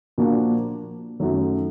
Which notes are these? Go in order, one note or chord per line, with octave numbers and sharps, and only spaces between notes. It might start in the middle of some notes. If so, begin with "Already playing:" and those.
A#2 F3 A#3 D4 F#4
F#2 D#3 F#3 A3